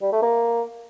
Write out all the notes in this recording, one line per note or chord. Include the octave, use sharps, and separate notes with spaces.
G3
A3
A#3